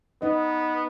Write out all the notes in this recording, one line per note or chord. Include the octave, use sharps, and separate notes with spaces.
B3 D#4 D#5